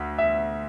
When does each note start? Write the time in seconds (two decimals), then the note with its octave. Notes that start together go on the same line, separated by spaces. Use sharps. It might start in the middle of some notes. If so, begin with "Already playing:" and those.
Already playing: D2
0.18 E5